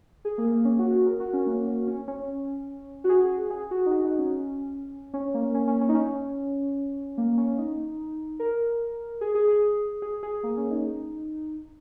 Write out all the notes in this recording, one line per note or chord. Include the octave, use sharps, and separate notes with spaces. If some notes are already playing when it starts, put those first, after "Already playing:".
G#4
A#3
A#3
C#4
F#4
G#4
A#4
F#4
C#4
A#3
C#4
C#4
C#4
F#4
G#4
G#4
F#4
D#4
F#4
D#4
C#4
C#4
A#3
C#4
C#4
C#4
D#4
C#4
A#3
C#4
D#4
A#4
G#4
G#4
G#4
G#4
G#4
A#3
C#4
D#4